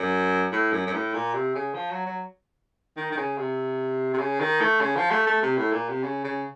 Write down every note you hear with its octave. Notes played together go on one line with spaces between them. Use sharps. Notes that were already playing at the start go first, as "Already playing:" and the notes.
Already playing: F#2
A2
F#2
F#2
A2
A#2
C3
C#3
F3
F#3
F#3
D#3
D#3
C#3
C3
C3
C#3
D#3
A3
C#3
F3
A3
A3
C3
A2
A#2
C3
C#3
C#3